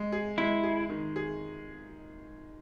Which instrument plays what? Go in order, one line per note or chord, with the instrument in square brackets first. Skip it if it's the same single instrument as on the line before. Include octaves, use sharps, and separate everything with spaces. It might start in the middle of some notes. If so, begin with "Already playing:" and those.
Already playing: [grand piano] G#3
G#4
[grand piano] G#3 [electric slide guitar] E4
[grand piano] G#4
D#3
G#4